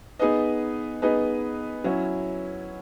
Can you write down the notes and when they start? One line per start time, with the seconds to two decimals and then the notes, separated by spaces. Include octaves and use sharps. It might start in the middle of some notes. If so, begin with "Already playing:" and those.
0.20 B3 D#4 G#4 B4 D#5
1.02 B3 D#4 G#4 B4 D#5
1.84 F#3 C#4 E4